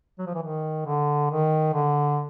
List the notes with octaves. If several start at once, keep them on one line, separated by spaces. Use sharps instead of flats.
F#3
F3
E3
D#3
D3
D#3
D3